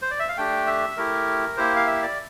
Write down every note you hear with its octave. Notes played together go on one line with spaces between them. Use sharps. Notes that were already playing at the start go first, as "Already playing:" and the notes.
C5
D5
E5
F5
A3 D4 G4 G5
E5
A3 E4 G4 A#4
A#3 E4 G4 C5
F5
E5
D5